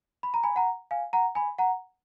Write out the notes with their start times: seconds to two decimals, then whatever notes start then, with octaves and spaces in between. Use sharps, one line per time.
0.23 B5
0.34 A#5
0.44 G#5 B5
0.56 F#5 A#5
0.91 F5 G#5
1.13 F#5 A#5
1.35 G#5 B5
1.58 F#5 A#5